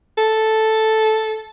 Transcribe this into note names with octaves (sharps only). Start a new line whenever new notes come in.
A4